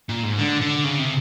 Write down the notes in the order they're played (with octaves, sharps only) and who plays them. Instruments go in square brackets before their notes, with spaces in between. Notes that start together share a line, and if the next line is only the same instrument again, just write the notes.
[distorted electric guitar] A#2
G#2
D3
D3
C#3
C3